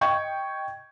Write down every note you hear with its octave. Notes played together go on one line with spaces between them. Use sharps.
D#5 G5 C#6 G#6